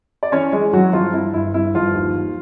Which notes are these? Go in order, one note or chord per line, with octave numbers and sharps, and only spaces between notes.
D5
E3 C#4 C#5
E3 G#3 G#4
E3 F#3 F#4
G2 F3 F4
G2 E4
G1 E4
G2 E4
G1 F3 F4
D#2
F3